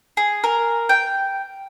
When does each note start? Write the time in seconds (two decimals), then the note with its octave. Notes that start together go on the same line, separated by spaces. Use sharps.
0.17 G#4
0.44 A#4
0.89 G5